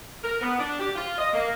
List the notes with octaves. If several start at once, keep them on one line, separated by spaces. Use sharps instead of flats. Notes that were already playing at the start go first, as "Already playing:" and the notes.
A#4
B3
D4
G4
F4
D#5
A#3